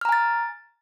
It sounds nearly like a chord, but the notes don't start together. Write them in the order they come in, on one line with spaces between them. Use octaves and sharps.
F6 A#5 G#5 A6